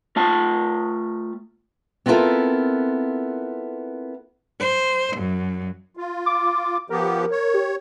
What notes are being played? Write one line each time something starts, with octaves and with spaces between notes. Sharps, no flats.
A3 F4 A5
B3 C4 E4 F4 A4 A#4
C5
F#2
F4
D6
F3 B3 G4 A#4
C#5
G4